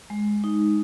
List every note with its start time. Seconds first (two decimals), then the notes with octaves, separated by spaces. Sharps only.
0.10 G#3
0.44 D#4